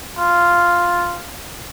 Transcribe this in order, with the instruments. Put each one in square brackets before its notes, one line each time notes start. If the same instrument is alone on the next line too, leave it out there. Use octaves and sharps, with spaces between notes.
[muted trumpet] F4